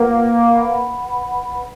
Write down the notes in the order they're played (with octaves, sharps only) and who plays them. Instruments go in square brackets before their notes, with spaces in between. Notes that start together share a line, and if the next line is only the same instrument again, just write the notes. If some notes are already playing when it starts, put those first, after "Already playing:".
Already playing: [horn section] A#3 [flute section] F4 B4 F#5
[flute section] B4 F#5 B5